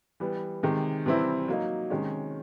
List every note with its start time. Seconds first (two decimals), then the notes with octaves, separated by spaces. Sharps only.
0.20 E3 G3 B3
0.63 C3 D#3 G#3
1.06 C3 E3 G3 C4 E4
1.48 F#3 A#3 D#4
1.90 C3 D#3 G#3 C#4